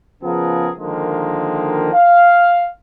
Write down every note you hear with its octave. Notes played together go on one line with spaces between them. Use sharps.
C#3 F3 B3 G#4 A#4
D3 D#3 F3 G#3 A#3
F5